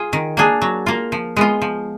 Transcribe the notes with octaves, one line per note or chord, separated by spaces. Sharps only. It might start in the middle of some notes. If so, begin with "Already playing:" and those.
Already playing: F4 G#4
D#3
A#3 D4 G#4
F#3
A#3 F4
F3
G#3 B3 F4
F3